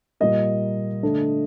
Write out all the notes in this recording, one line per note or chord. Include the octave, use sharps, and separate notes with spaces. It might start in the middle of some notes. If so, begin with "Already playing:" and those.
A#2 G3 A#3 D#5
D3 A3 D4